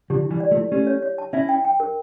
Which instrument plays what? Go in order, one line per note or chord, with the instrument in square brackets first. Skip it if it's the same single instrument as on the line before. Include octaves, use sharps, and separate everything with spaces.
[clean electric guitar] D3 F3 [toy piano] G4
[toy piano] E4
[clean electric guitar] E3 G3
[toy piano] D5
[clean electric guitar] F3 A3
[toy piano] E4
[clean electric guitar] A3 C#4 [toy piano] G4
[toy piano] C#5
C#5
A5
[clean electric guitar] C#4 E4 [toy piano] E5
[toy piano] G5
G5
A#4